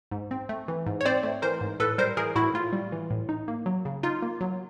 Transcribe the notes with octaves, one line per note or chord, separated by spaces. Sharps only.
G#2
C4
A3
E3
G#2
C#5
C4 C5 D5
A3
E3 A#4 C5
G#2
A2 A4 B4
G3 A#4 C5
E3 G#4 A#4
A2 E4 F#4
A2 F4
G3
E3
A2
D#4
A#3
F#3
C#3
D#4 F4
A#3
F#3